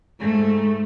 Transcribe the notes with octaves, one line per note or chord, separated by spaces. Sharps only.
G#2 A3